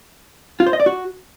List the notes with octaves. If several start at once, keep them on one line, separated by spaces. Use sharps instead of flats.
F4
C5
D#5
D5
F#4